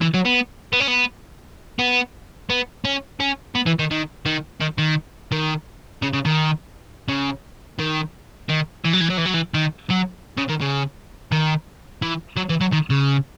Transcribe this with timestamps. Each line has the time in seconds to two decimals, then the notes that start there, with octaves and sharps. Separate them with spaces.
0.02 E3
0.14 F#3
0.25 B3
0.73 B3
0.80 C#4
0.88 B3
1.79 B3
2.50 B3
2.85 C#4
3.20 C#4
3.55 B3
3.66 E3
3.79 D#3
3.91 D#3
4.25 D#3
4.61 D#3
4.78 D#3
5.32 D#3
6.02 C#3
6.14 C#3
6.25 D#3
7.08 C#3
7.79 D#3
8.49 D#3
8.85 E3
8.93 F#3
9.01 E3
9.10 F#3
9.18 E3
9.26 F#3
9.34 E3
9.54 D#3
9.90 F#3
10.38 C#3
10.49 D#3
10.61 C#3
11.32 D#3
12.02 E3
12.37 F#3
12.49 E3
12.61 F#3
12.72 D#3
12.90 C#3